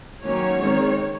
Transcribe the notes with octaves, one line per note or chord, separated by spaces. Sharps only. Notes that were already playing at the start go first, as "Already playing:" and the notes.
D#3 F#3 A#3 C#4 C#5
D#3 G#3 C4